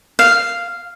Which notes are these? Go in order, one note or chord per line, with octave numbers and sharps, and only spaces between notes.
F5